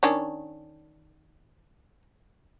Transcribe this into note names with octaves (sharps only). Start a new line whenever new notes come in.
D#3 C#4 D4